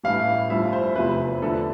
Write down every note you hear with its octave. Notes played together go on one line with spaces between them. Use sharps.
A1 G2 E3 A3 F5
G1 G2 F3 A3 E5
C5
F1 E2 C3 F3 A3 B4
E2 D3 F3 A3 A4